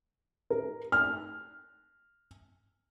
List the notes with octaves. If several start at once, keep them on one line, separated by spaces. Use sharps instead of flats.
A#4
F6